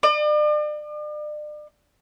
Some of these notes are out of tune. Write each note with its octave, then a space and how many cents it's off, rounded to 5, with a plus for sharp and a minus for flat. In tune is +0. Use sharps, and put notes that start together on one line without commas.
D5 +40